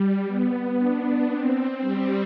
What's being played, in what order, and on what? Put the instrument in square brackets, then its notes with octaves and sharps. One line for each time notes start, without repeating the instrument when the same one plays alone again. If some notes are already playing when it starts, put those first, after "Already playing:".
Already playing: [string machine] G3
B3
D4
C4
G3